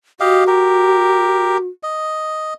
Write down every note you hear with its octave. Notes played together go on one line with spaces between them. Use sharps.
F#4 G4 D#5 F5
G4 A#4
D#5